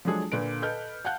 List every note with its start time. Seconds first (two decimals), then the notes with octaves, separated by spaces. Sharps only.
0.05 F3 F#3 G#3 D4 G#4 A4
0.32 A#2 D3 B4 D7
0.62 A4 B4 D#5 F6 G6
1.05 F5 F#5 A5 F#6 G6